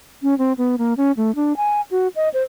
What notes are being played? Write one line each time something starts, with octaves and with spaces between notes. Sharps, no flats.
C#4
C4
B3
A#3
C#4
A3
D4
G#5
F#4
D#5
C5